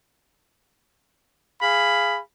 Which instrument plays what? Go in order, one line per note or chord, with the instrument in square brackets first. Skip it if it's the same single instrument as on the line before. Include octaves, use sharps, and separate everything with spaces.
[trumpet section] G#4 F5 B5